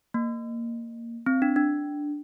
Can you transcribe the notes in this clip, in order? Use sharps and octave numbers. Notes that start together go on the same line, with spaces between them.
A#3
C4
D4
D4